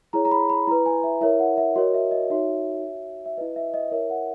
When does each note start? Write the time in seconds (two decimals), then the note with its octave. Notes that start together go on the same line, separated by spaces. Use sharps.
0.13 E4 G#4 C#5 A#5
0.25 A#5
0.31 B5
0.50 B5
0.67 E4 B4 A#5
0.86 G#5
1.03 E5
1.21 E4 A#4 C#5 E5
1.40 F#5
1.57 E5
1.76 F#4 A#4 C#5 D#5
1.94 E5
2.11 D#5
2.30 D#4 F#4 C#5 E5
2.84 F#4 C#5
3.26 E5
3.37 E4 B4 D#5
3.56 E5
3.74 D#5
3.91 E4 A#4 C#5 E5
4.10 F#5